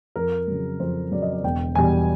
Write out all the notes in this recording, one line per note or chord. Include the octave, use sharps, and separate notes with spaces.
F2 A#4
C#3 F#3
F2 C5
C#3 F#3 D5
D#5
D5
E1 G5
E2 B2 G3 G#5